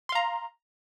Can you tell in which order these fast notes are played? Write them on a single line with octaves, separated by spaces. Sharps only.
C6 F5 A#5